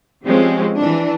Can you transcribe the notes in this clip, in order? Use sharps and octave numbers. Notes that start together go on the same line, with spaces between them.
F3 G3 G#3 C4 C#4
E3 D4